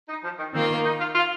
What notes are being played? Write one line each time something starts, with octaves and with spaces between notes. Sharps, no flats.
D#4
F3
D#3
D#3 A#3 C4 F4
D#4
F4
F4